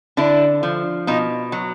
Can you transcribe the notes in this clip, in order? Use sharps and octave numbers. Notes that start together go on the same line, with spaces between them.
D3 D4 E4
F3
B2 D#4 F4
F#3